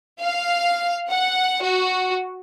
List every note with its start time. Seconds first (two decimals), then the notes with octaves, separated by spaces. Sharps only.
0.21 F5
1.10 F#5
1.63 F#4